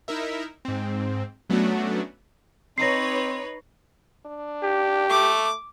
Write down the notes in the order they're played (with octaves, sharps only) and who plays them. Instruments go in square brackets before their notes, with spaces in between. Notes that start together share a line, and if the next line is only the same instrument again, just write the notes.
[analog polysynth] D#4 E4 A#4 E5
G#2 C4
F#3 A3 B3 C#4 D4 F#4
[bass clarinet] C4 [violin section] D#4 B4 C#5 [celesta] A#6 C7
[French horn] D4
[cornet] G4
[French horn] A3 [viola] D6